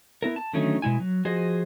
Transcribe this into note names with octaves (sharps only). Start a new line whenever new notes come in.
B3 E4 A#4
A5
D3 D#3 F#3 A3 C#4 D#4
B2 G#3 E4 G#5
F#3
F3 F#4 G#4 C5 D#5